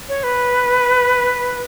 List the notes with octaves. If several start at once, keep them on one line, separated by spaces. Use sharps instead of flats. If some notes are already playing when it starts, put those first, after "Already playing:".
C#5
B4